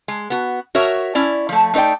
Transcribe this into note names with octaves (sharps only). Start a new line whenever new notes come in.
G#3
B3 F#4
F#4 A#4 C#5 E5
C#4 E4 D5
F3 A3
A3 D#4 B4 D5 G5